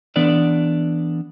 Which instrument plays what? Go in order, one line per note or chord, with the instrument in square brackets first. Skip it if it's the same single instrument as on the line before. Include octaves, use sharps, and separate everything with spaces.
[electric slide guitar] E3 B3 D4 A4 D5